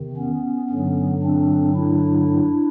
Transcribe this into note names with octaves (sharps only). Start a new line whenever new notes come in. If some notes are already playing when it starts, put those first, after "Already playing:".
Already playing: E2 C3 D#3
B3 C#4
G2 D3 F#3
C4 D4
D4 E4